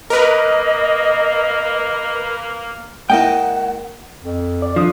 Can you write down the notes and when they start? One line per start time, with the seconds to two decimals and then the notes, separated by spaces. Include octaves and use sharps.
0.10 A#3 A#4 B4 D#5
3.10 G#3 A#3 E4 A#4 D#5 F#5 G5
4.23 F2
4.62 D5
4.76 F3 D4 D#6